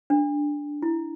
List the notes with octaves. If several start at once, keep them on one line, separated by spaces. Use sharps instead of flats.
D4
E4